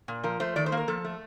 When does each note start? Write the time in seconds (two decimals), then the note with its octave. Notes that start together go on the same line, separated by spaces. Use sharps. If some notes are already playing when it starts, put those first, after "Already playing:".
0.08 A#2
0.23 F3 A#4
0.40 A3 C5
0.56 D#3 D5
0.66 C5
0.72 A#3
0.77 A#4
0.88 F3 A4
1.05 A3